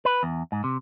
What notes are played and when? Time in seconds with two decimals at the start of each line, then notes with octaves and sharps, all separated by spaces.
0.05 B4
0.23 E2
0.52 G#2
0.64 C3